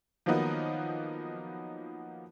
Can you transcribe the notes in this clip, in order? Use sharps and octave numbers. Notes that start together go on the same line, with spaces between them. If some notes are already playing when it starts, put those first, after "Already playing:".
D#3 F3 F#3 A#3 B3 D#4